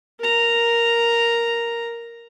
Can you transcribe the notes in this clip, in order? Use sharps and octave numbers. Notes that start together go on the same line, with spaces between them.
A#4 A#5